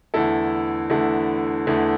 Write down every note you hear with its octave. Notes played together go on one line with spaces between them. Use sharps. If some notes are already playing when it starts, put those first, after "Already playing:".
E2 D3 A3 E4 A4
E2 D3 A3 E4 A4
E2 D3 A3 E4 A4